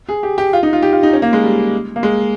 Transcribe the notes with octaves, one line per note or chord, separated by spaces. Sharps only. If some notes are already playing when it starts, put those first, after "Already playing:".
G#4
G4
G4
F4
D#4
F4
G4
F4
D#4
C#4
A#3
G#3
G3
A#3
G#3